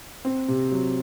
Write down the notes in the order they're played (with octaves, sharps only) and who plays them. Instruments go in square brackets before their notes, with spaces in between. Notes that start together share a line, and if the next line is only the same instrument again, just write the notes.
[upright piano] C4
C3
F#3